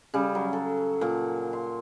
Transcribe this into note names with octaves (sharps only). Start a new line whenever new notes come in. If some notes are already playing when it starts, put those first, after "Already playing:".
C#3 G3
F#3
A4
A#2
C6